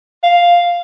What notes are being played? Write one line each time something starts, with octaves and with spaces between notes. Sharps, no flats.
F5